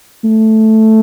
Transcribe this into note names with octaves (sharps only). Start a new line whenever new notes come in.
A3